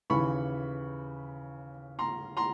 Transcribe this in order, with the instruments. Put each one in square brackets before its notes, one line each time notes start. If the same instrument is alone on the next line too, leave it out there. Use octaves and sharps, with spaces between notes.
[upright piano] D#2 C#3 E3 B5 C#6
A#5 C6
A#5 C6